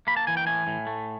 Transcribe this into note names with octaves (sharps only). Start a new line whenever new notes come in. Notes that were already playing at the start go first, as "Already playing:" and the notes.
A#3 B5
A5
E3 G#5
G5
A2 G#5
A2
A3